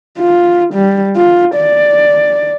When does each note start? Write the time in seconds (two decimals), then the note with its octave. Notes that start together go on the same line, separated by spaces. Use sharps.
0.19 F4
0.74 G3
1.16 F4
1.56 D5